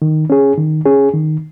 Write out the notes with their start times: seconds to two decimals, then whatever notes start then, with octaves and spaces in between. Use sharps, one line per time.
0.02 D#3
0.30 C#4 G#4
0.58 D#3
0.86 C#4 G#4
1.13 D#3